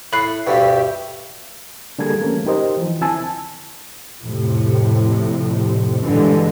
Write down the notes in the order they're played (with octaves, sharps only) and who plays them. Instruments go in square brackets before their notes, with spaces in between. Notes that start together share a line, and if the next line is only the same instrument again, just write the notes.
[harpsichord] A2 [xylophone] B5 F#6 C7
[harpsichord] D2 G2 B2 [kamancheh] G4 E5
[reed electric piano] D3 G3 A#3 G#4 A4 G#6
E3 G3 A3 A#3 C4 C#4
D#4 G4 A#4 C5 D#5
E3 F3
D3 C4 E4 G#5 A5 E6
[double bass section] F2 A2 C3
G2 A#2 D3 E3 G#3